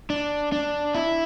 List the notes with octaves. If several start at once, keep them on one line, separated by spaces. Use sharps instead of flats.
D4
D4
E4